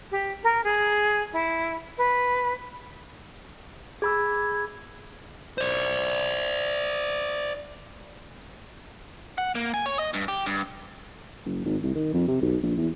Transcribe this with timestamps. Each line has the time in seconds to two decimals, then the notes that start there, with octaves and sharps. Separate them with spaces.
0.11 G4
0.43 A#4
0.63 G#4
1.32 E4
1.97 B4
4.02 G#4 B5 E6 G#6
5.58 C5 D5
9.38 F#5
9.55 A#3
9.74 G#5
9.86 C#5
9.99 D#5
10.14 G2
10.28 G4
10.46 G2
11.46 F#1
11.65 G#1
11.83 C2
11.95 D#3
12.13 F2
12.28 C3
12.41 B1
12.63 A#1
12.77 E2